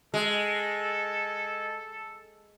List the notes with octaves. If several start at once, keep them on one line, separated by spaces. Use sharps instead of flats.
G#3 A4